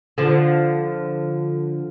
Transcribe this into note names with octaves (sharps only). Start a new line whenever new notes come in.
D3 F3